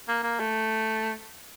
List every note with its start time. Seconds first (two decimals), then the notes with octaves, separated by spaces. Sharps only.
0.08 A#3
0.23 A#3
0.40 A3